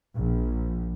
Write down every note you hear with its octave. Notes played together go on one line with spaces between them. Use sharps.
A#1